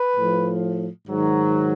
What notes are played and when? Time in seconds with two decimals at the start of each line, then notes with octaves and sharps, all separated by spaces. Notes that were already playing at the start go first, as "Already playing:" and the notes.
Already playing: B4
0.15 A2 F3
1.07 G#2 D#3 F#3